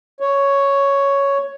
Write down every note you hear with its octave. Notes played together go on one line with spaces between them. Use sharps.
C#5